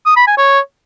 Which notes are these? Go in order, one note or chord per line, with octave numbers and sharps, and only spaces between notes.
D#6
B5
G#5
C#5